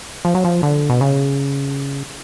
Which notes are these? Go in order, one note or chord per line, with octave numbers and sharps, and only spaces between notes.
F3
F#3
F3
D3
B2
C#3